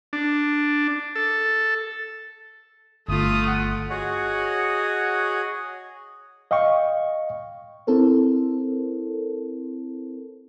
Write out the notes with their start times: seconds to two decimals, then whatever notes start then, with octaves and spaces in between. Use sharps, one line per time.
0.13 D4
1.16 A4
3.09 G1 A3 F4 D#6
3.47 F#5
3.90 F#4 G#4 C#5 D#5 F#5
6.51 D#5 F5 G5 C#6
7.87 C4 E4 A4 A#4 C5